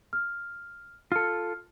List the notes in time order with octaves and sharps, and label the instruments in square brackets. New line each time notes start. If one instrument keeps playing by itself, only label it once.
[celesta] F6
[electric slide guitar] F4 A4 [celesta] F6